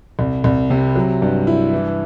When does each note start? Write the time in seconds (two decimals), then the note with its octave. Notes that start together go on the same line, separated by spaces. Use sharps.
0.19 C2
0.44 C2
0.70 C3
0.95 F#3
1.22 G2
1.47 E4
1.73 E3